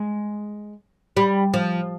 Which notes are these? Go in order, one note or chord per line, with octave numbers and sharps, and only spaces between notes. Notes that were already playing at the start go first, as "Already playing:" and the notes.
Already playing: G#3
G3
F3